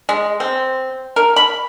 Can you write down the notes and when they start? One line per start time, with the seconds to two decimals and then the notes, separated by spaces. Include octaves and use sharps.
0.09 G#3
0.40 C4
1.16 A#4
1.36 B5